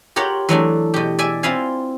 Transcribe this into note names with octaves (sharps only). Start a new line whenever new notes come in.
F4 G4 A#4 C#5 F#5
E3 F#3 A3 D4
B2 G4
D5 E5 G#5
C4 E4 F4 E5 F5 G#5